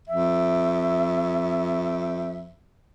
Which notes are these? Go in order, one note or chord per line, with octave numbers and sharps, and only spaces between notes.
F2 E5